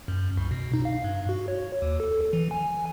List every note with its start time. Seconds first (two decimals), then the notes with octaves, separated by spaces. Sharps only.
0.08 F#2
0.37 C2
0.51 B2
0.74 D#4
0.85 F5
1.04 G2
1.29 F#4
1.48 C#5
1.82 D#2
2.00 A4
2.33 E3
2.51 G#5